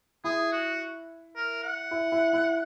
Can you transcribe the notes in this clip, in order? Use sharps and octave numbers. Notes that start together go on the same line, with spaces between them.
E4 G#4
F#4
A#4
F#5
E4
E4
E4